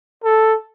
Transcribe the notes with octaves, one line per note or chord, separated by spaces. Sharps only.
A4